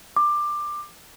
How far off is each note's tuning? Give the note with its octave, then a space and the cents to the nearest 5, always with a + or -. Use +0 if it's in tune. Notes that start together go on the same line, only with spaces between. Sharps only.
D6 +20